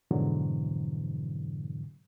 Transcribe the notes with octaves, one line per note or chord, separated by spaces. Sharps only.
F2 G#2 B2 D3 E3 F#3